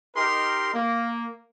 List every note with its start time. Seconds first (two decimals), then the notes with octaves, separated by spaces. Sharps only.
0.16 D#4 G4 A#4 C6
0.73 A#3